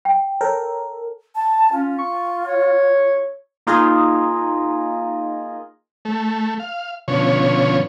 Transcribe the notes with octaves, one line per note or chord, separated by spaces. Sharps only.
G5
A4 A#4 C#5
A5
C#4 F4
C#6
C#5
A#3 D#4 F4 G#4 D#5
A3
F5
B2 D3 F3 C#4 C#5